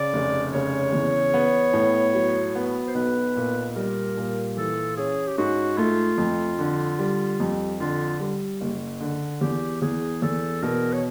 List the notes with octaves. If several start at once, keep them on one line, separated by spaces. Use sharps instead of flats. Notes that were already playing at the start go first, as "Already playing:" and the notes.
Already playing: C#3 D5
F1
C#3 C#5
E2
B3
A2
F#3
B3
C5
B1 B4
A#2
G3 A#4
A#2
E3 A4
C#4 G#4
G4
G#2 F#4
A3 F4
F2
D3
G3
F2
D3 F4
G3
F#1
D3
E2 G4
E2 G#4
E2 A4
B2 A#4
C#5